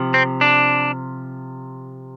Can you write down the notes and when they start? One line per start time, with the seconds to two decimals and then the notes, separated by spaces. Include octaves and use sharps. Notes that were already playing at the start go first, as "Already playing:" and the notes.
Already playing: C3 F3
0.14 C4
0.41 D4